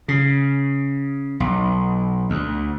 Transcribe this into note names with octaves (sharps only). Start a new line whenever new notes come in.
C#3
B1
D2